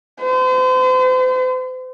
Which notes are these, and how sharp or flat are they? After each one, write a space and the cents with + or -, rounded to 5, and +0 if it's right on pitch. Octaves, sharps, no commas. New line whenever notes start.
C5 -40